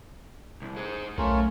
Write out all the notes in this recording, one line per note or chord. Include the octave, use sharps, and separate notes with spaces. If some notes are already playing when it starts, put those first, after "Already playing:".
C2
G#4 C5
B1 A3 C#4 F4 A#4